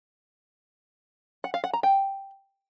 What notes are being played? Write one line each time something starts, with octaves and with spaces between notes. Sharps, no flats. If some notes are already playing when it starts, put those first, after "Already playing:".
F#5
F5
F#5
A#5
G5